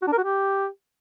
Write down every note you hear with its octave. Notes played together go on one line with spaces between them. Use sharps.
F#4
D4
A#4
F#4
G4